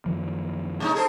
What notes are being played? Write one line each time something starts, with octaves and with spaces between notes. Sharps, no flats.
F#2 D#3 F3
B2 G#3 D#4
G#4 A4 C5